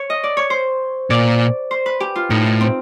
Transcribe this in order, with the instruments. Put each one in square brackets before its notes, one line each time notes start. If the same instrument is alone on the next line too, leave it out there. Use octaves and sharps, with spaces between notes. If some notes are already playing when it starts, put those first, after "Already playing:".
Already playing: [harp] C#5
D#5
D5
C#5
C5
[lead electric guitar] A#2 [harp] D5
[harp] C5
B4
G4
F4
[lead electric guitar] A2 [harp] D#4
[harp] D#4
C4